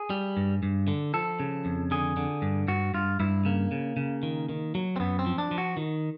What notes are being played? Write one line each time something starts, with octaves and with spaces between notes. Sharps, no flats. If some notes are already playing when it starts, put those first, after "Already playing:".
Already playing: G#4
G3
G2
G2
D3
F3 A4
C#3
F2
D3 G#4
D3
G2
G2 F#4
G2 F4
G2 E4
C#3 A#3
C#3
C#3
D#3
D#3
F#3
C4
F#2 B3
C4
F3
D4
F3
F#4
D#3